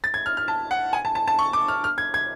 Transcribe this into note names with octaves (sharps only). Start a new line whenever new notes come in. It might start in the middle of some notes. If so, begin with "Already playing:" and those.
A6
G#6
F6
F6
A5
F#5
G#5
A5
A5
A5
C#6
D6
F6
F6
G#6
G#6